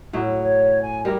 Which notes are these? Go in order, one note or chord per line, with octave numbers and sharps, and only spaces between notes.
A2 F#3 E4
C#5
G#5
G3 E4 A#4